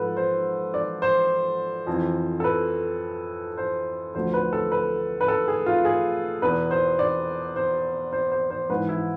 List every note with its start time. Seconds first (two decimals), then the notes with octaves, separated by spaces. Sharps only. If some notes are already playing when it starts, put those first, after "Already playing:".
Already playing: G#2 F3 A4 B4
0.17 C5
0.74 D5
1.02 C5
1.87 F2 E3
2.40 A4
2.44 B4
3.58 C5
4.15 D2 D3 F3 C5
4.34 B4
4.53 A4
4.72 B4
5.21 B4
5.28 A4
5.48 G#4
5.66 F4
5.85 G#4
6.42 E2 B2 B4
6.71 C5
6.99 D5
7.56 C5
8.13 C5
8.32 C5
8.50 C5
8.70 G#2 E3 B4
8.89 E4